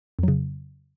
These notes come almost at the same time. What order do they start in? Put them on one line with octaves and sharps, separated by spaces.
F2 F#3 C#3